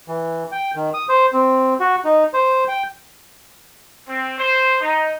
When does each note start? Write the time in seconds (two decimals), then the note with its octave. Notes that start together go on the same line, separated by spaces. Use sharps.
0.08 E3
0.52 G5
0.75 D#3
0.94 D#6
1.09 C5
1.33 C4
1.80 F#4
2.05 D#4
2.34 C5
2.68 G5
4.08 C4
4.39 C5
4.81 D#4